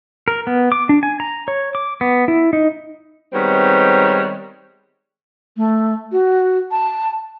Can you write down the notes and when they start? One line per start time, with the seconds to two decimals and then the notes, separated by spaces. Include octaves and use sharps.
0.28 A#4
0.47 B3
0.72 D6
0.89 D4
1.03 G#5
1.20 A#5
1.48 C#5
1.75 D6
2.01 B3
2.28 E4
2.53 D#4
3.33 D#3 G3 G#3 B3 C4 C#5
5.57 A3
6.12 F#4
6.71 A5